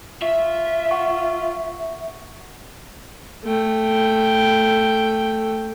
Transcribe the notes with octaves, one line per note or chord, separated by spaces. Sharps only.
F4 E5 C#6
F#5 C#6
A3 G5